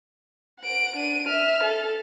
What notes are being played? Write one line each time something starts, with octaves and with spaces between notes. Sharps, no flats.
F#5 D7
D4 D#7
E5 F6
A4